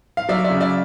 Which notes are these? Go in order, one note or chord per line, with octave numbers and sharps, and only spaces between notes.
F5
F#3 D5 E5
D5 E5
C#3
D5 E5